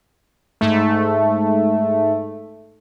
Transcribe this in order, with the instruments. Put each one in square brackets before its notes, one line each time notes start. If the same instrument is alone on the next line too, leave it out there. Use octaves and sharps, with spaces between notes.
[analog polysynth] G#2 A3